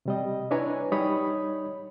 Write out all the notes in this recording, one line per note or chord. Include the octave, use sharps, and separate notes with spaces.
C3 G3 D#5
D4 E4 B4 C#5 G#5 A#5
G3 D#4 C#5 B5 D#6